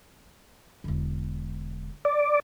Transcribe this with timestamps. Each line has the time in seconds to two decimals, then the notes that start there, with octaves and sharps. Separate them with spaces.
0.84 E1 D3
2.05 D5